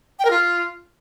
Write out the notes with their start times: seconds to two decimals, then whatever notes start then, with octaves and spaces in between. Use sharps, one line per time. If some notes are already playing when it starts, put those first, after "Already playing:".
0.19 G5
0.25 A#4
0.31 F4